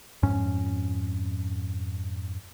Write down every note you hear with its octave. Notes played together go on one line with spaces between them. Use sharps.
F2 G#2 C#4